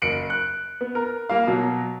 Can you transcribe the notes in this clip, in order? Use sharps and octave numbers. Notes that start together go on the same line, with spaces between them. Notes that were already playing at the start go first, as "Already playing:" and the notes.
F#1 C#7 D7 F#7
F#6
B3
A#4
G3 A#3 F5
B2 F#3